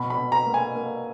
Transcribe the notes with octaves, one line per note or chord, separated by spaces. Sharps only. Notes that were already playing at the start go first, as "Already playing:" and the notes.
Already playing: B2 B5
B5
B2
A#5
A#3
G#5
A#3